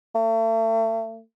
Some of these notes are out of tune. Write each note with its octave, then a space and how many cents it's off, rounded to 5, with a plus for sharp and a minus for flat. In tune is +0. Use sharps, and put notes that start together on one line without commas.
A3 +35